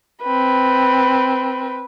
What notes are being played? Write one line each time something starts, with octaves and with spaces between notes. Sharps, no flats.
C4 B4